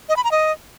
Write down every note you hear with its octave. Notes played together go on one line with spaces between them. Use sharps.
D#5
B5
A#5
D#5